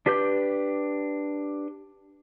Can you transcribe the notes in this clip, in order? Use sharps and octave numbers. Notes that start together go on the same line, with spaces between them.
D4 G4 B4 D6 G6